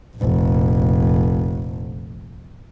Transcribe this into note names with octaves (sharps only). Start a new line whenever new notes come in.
F1 A#1